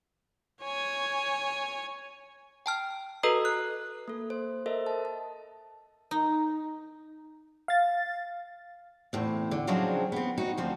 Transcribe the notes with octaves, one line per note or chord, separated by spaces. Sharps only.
C#5 G#5
G5 A5 F6
F#4 A4 B4 D#5 A#5 D#6
F#6
A#3 A4
C5
A4 A#4 C5 D#5 E5
A5
A5
D#4
F5 A6
E2 A2 C4
D3
C#3 F3 F#3 G#3 C4 D4
B3 C4
D#4 F#4
D2 F3 C4